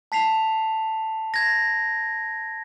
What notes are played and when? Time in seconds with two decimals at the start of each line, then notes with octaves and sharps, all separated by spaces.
0.12 A5 B6 C7 F7
1.34 G#6 A#6